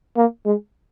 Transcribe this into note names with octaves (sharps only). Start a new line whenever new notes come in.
A#3
G#3